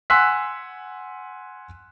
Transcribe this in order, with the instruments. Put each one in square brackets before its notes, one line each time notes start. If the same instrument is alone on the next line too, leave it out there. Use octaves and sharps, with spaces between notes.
[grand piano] F#5 G#5 C6 E6 F#6 B6